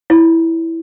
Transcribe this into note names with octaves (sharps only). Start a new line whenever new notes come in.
E4 C#5